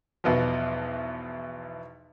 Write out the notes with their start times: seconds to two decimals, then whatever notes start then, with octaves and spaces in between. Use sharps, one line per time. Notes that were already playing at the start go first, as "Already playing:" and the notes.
0.24 B1 E2 B2 F3